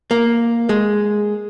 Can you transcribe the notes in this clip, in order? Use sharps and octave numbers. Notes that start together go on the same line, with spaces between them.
A#3
G#3